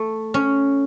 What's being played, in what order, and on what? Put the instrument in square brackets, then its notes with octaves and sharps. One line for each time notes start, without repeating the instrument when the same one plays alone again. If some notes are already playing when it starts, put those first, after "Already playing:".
Already playing: [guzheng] A3
C#4